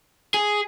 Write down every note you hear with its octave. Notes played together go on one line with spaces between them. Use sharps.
G#4